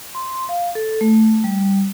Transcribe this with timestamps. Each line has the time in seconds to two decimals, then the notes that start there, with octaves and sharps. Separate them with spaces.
0.15 C6
0.49 F5
0.75 A4
1.01 A3
1.44 G3